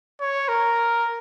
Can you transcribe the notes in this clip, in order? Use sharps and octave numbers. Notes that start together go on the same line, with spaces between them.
C#5
A#4